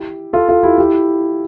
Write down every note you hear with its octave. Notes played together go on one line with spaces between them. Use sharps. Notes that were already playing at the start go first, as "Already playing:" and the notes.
Already playing: E4 G4
F4 A4
F4 A4
E4 G4
E4 G4